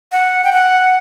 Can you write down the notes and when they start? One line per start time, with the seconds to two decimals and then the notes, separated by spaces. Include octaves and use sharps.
0.12 F#5
0.44 G5
0.53 F#5